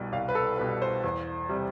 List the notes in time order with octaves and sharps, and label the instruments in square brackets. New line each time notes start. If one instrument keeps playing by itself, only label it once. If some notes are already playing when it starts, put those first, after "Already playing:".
Already playing: [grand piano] C2 B2 G3
C2 F5
B4
A4
B2 G3 B4
C5
E2
C3 G3